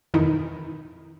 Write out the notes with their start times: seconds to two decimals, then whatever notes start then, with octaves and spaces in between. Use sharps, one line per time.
0.14 F2 B2 D#3 E3 D#4 E4